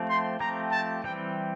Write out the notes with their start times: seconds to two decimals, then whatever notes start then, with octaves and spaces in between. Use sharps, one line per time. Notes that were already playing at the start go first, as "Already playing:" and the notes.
Already playing: F3 A3 C4 G4
0.09 C6
0.40 F3 A3 C4 G4 A#5
0.72 A5
1.04 E3 G3 C4 G4 G5